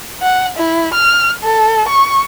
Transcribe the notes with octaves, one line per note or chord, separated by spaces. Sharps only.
F#5
E4
F6
A4
C#6